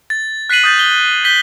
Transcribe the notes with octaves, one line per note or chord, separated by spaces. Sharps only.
A6
F#6 B6 C7 D#7 F#7
D#6 G6 A6
G7
G6 B6 G7